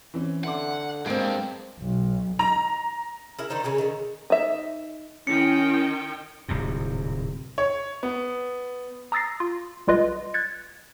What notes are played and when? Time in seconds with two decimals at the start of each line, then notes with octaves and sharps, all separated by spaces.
0.14 E3 C4 C#4
0.44 D3 E5 F#5 C6 D6
1.06 G2 G#3 A#3 C4 F5 D7
1.80 B1
2.39 A#5
3.39 E4 G#4 A#4
3.50 D#3 D4 D#4 C5
3.63 C#3 C#4 G#4 B4
3.78 D3 D#3
4.30 D#4 E5
5.27 D#3 C#4 E4 G5 C#7
6.48 D1 C2 G#2 C3
7.58 C#5
8.03 B3
9.12 A#5 D#6 E6 A6 A#6 C7
9.40 F4
9.87 B1 G3 F4 B4 D#5
10.34 F#6 G#6 A6 C#7